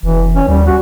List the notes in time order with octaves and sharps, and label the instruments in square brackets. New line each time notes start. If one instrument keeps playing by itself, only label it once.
[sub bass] F1 [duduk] E3
[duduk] C#4
[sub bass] D#2 [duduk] G3
[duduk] F#4